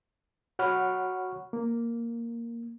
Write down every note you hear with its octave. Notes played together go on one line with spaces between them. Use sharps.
F#4 C#5 F#5 B5 C#6 F6
A#3